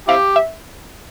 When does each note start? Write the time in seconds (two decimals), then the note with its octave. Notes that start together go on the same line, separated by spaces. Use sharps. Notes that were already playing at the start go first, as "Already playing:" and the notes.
0.08 C4 E4 G4 F5
0.36 E5